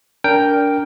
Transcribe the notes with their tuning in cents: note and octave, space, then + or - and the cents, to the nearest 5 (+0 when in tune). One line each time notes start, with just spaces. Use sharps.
D4 -25 A#4 +0 G5 +0